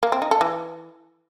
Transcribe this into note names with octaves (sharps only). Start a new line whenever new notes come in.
A#3
C4
D#4
A4
E3